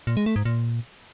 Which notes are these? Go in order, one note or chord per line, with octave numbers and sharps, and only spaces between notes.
A#2
G#3
A3
G#2
A#2